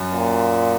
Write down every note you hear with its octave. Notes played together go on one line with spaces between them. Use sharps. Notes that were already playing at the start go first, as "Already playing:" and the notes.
Already playing: F#2
A#2